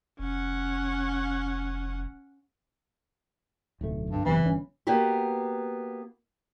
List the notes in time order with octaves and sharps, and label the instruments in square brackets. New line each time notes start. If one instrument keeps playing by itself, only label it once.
[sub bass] F1 [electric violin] C#4 F#5
[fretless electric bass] D1 B1 A3
[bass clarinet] G2
[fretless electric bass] F#1 C3 B3 [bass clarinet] E3
[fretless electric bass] G1 C#4
[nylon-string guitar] A#3 B3 F#4 G4